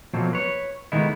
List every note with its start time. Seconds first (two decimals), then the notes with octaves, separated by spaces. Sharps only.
0.13 B2 F3 F#3 A3 A#3 C4
0.33 B4 C#5
0.92 D#3 G#3 A3 B3 D#4 E4